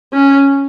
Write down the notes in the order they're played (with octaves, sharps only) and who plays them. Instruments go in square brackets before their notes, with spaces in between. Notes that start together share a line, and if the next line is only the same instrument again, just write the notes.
[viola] C#4